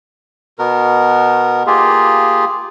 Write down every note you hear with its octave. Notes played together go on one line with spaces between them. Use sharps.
B2 B3 A#4
A#3 F4 G4 G#4